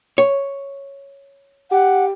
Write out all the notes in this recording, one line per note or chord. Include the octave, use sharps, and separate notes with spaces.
C#5
G4 F#5